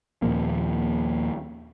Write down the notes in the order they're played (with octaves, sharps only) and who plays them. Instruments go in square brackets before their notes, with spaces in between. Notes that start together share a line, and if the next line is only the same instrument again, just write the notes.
[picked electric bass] D#2 A#2 F3 A#3